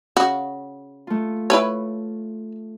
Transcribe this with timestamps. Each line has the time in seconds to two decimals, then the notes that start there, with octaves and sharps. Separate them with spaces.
0.17 C#3 F#4
1.07 A3 F4
1.50 E4 B4 C#5